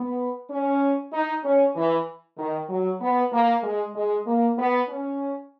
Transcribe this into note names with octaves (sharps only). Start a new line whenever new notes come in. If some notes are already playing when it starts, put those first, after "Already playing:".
Already playing: B3
C#4
D#4
C#4
E3
D#3
F#3
B3
A#3
G#3
G#3
A#3
B3
C#4